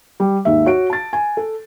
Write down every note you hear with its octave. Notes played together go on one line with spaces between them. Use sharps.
G3
D#2 G#2 E5
F#4 C#5 D7
A5 A6
G#5
A4